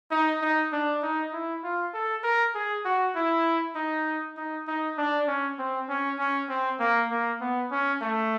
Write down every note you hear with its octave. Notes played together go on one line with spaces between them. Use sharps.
D#4
D#4
D4
D#4
E4
F4
A4
A#4
G#4
F#4
E4
D#4
D#4
D#4
D4
C#4
C4
C#4
C#4
C4
A#3
A#3
B3
C#4
A3